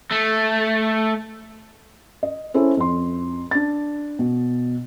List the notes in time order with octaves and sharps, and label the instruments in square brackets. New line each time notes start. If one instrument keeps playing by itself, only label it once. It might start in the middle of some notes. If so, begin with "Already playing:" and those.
[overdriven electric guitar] A3
[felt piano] D#5
C#4 E4 A4 C5
F2 C6
D4 A6
B2